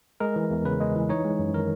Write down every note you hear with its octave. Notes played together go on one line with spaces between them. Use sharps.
G#3 A#4
E3
E2
C#3 B4
G#3
E3
D#4 C#5
G#3
F#2
D#3 A#4